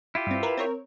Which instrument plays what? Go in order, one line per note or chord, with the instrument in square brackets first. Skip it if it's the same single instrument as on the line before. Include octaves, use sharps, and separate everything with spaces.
[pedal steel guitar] E4 F4 G4
[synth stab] G2 C4
A#4 B4
C4 A#4 C#5